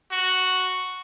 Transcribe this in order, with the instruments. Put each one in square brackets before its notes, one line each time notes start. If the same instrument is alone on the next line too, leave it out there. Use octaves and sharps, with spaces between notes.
[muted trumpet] F#4